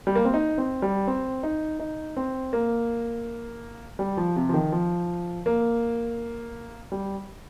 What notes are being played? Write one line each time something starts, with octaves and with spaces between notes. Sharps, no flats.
G3
A#3
C4
D#4
C4
G3
C4
D#4
D#4
C4
A#3
G3
F3
C3
F3
D#3
F3
A#3
G3